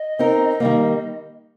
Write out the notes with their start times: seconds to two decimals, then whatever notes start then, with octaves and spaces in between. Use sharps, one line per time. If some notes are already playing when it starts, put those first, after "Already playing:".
Already playing: D#5
0.19 C4 D#4 A#4
0.60 D#3 G3 A#3